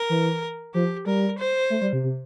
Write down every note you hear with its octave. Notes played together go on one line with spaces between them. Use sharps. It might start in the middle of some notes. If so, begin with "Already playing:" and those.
Already playing: A#4
E3
F3 G4
G3 A#4
C5
A3
G3
C3
C3